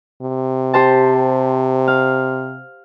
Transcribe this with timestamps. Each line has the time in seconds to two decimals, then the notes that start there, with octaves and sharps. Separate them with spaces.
0.22 C3
0.74 G4 C5 A5
1.88 F5